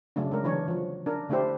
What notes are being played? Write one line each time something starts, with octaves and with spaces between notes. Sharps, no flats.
C#3 F#3 A3 D4
G#3 D4 A#4
D3 E3 F#3 D4 C#5
F3 F#3
D4 A#4
D3 A3 D4 E4 G4 C5